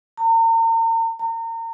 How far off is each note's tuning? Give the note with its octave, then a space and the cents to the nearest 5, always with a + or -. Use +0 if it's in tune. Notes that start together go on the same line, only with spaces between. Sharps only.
A#5 -40
A#5 -35